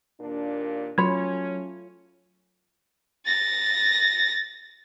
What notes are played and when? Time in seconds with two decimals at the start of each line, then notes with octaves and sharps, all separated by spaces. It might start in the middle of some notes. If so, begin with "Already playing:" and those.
0.20 D#2 A#2 D4
0.98 F#3 A3 C#4 F4 C#5 B5 G#6
3.26 A6 A#6